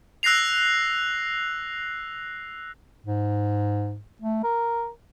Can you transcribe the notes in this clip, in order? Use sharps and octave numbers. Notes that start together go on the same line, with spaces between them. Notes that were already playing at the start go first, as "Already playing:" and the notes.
E6 F#6 A#6 C7 F7
G#2
A3
A#4